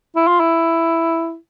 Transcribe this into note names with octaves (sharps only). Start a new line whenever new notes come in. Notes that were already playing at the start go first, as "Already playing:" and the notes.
E4
F4
E4